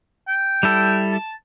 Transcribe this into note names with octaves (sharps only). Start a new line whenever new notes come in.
G5
G3 E4 A4
A5